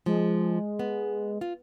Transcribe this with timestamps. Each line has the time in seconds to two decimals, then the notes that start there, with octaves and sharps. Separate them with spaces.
0.06 F3 G#3
0.79 B3
1.41 F4